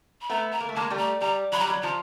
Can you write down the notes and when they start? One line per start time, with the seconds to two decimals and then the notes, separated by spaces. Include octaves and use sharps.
0.21 B5
0.29 A3 B3 A#5
0.52 A#5
0.60 A#3
0.69 A3
0.76 G#3 A#3 A5
0.90 G3 A3
0.99 A#5
1.21 G3 A#5
1.52 F#3 B5
1.59 G3 A#5
1.67 B5
1.70 F#3
1.82 F3 A#5